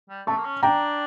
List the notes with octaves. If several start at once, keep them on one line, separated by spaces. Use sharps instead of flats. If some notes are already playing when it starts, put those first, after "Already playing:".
G3
A3 A5 C#6
A#3
C#4
D4 G5 A#5